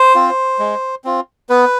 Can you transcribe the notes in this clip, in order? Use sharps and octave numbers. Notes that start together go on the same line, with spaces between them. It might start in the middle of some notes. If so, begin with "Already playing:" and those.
Already playing: C5
C4 F4
G#3
C4 F4
B3 B4